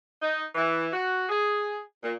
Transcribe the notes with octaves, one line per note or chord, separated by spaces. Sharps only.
D#4
E3
F#4
G#4
A#2